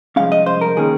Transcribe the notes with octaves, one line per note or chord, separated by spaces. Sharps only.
C2 A#2 F3 G#3 C#4 F5
D#5
C5
A#4
D#3 A#3 C#4 G#4